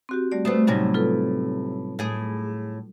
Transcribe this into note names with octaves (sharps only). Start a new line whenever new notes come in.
C4 F#4 G4
G3 A3 D5
A3 B3 C5 D#6
A2 C3 F#3 G3 C#4 D#4
F4 A4 B4
A2 G#4